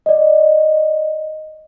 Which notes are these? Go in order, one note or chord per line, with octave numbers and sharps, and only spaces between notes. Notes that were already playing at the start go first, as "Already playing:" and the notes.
D5 D#5